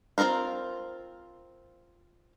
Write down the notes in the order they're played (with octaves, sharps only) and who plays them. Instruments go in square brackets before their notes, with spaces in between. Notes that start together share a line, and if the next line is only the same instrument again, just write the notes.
[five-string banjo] C4 F4 A4 A#4 F5